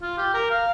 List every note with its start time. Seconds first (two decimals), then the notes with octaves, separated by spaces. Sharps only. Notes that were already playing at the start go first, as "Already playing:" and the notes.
0.02 F4
0.17 G4
0.33 A#4
0.51 F5